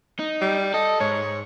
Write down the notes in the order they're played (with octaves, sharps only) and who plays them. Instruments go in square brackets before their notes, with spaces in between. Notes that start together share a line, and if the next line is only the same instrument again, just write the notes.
[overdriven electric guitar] D#4
[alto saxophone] G3
[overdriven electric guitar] A4 [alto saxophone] D#5
[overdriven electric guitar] G#2 [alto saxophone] C#5